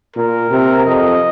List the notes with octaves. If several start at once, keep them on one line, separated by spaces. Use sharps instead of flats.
A#2 A#4
C3
F2 D#5